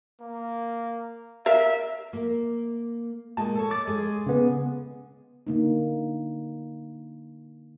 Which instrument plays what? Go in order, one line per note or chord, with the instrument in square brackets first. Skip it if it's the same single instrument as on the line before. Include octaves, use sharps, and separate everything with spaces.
[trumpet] A#3
[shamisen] A#4 F5 [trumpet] E5
[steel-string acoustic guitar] A#3
[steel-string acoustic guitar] A#2 G#3 A#3 [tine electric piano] A5
[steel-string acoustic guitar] A4 C5 C#5
[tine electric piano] D6 A6
[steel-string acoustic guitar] G#3 G#4
[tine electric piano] C#3 B3
[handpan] D3 A#3 D#4